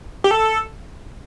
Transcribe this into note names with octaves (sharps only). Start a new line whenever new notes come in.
G4
A4